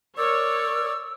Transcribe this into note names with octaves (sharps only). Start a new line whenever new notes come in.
A#4 C#5 D5 E6